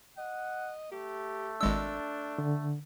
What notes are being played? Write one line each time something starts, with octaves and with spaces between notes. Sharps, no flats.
D#5 F#5
A3 G4
G#1 G#3 D4 E6
D3